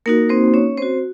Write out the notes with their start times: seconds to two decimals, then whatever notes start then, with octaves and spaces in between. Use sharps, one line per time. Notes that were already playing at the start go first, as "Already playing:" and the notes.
0.06 A#3 D#4 F#4 A#4
0.29 C4 C5
0.54 C#4 C#5
0.77 C4 F#4 C5